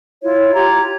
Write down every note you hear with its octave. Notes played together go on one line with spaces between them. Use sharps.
E4 F4 C#5
F4 G4 A#5 G#6